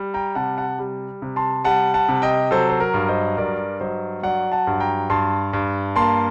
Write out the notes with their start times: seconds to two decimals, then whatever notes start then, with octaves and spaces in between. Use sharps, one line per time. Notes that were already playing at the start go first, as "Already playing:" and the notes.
Already playing: G3
0.14 G5 A#5
0.35 C3 F#5 A5
0.57 F#5 A5
0.79 G3
1.22 C3
1.36 A5 C6
1.65 G3 F#5 A5
1.94 F#5 A5
2.09 C3
2.22 D#5 G5
2.51 F#3 A4 C5
2.70 C5
2.80 A#4
2.94 G2
3.08 C5 D#5
3.37 G2 A#4 D5
3.80 F#3 C5 D#5
4.23 F#3 D5 F#5
4.52 F#5 A5
4.67 G2
4.80 G5 A#5
5.10 G2 A5 C6
5.53 G2
5.96 A#3 A5 C6